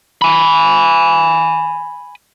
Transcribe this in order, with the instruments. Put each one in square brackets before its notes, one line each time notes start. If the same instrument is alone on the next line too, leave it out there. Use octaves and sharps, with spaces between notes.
[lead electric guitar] G#5 B5